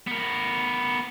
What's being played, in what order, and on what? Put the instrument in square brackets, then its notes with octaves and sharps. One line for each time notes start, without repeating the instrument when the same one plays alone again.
[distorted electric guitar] B3 A#4